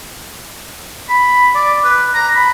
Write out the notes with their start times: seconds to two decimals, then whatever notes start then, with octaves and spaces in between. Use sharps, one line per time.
1.09 B5
1.55 D5
1.84 B4
2.14 A#5
2.35 B5